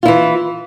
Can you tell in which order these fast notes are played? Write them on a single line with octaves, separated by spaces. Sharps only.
F4 E4 E3